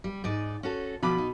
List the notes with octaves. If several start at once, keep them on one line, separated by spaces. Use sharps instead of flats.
G3
G#2 D#4 D5
C#4 F#4 A4
B2 F3 B5 D6
D#4